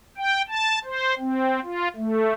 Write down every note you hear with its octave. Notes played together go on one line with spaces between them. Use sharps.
G5
A5
C5
C4
F4
A3